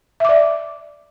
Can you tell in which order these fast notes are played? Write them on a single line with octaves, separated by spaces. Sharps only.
E5 D6 D5